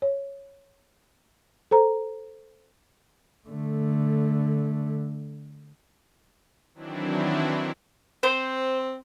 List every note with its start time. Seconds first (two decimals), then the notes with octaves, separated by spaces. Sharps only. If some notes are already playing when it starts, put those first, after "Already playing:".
0.02 C#5
1.71 A4 C5 A#5
3.48 D3 A3
6.74 D#3 E3 F#3 C4 D4 E4
8.23 C4 C5